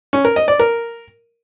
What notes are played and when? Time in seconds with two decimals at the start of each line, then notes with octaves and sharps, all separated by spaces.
0.13 C#4
0.25 A#4
0.36 D#5
0.48 D5
0.60 A#4